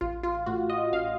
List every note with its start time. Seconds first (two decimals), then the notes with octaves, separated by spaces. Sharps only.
0.01 A1 F4
0.23 F4
0.46 A2 F#4
0.70 D#5
0.92 A1 F5